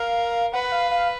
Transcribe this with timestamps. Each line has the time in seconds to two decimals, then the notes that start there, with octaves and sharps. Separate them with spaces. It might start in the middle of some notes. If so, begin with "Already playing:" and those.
Already playing: A#4 F5
0.53 B4 F#5
0.72 F5
0.91 F5